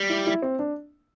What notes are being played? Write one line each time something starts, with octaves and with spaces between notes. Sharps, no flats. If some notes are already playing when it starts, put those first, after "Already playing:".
Already playing: G3
E4
E4
C4
D4